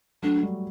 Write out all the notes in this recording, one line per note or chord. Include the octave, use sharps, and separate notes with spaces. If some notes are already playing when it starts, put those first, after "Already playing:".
F#3 A3 D4
G3